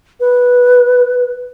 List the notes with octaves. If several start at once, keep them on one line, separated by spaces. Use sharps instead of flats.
B4